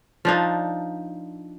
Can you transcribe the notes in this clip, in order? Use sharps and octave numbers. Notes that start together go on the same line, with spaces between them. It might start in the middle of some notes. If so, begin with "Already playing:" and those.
F3 D4 D#4